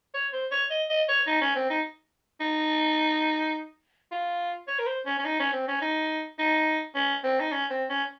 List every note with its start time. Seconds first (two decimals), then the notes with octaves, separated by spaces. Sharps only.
0.14 C#5
0.33 C5
0.51 C#5
0.70 D#5
0.90 D#5
1.08 C#5
1.27 D#4
1.41 C#4
1.55 C4
1.70 D#4
2.40 D#4
4.12 F4
4.68 C#5
4.79 A#4
4.87 C5
5.06 C#4
5.19 C#4
5.25 D#4
5.39 C#4
5.53 C4
5.68 C#4
5.82 D#4
6.39 D#4
6.95 C#4
7.23 C4
7.40 D#4
7.52 C#4
7.71 C4
7.90 C#4